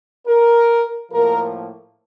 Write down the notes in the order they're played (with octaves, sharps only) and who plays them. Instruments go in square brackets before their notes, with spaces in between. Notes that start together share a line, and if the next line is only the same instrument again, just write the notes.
[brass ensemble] A#4
A2 F3 A#3 A#4